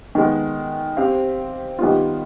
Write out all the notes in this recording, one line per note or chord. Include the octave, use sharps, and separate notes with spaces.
D#3 G#3 B3
C4 G4 C5 F5
D#3 G3 B3 F4